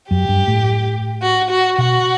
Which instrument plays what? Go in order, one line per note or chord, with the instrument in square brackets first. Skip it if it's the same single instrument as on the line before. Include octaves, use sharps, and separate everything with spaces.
[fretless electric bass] F#2 [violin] G4
[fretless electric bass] G2
A2
[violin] F#4
F#4
[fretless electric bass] B2 [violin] F#4